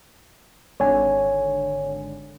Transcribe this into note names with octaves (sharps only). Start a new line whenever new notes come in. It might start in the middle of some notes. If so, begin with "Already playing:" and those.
G#1 D3 C#5 G#5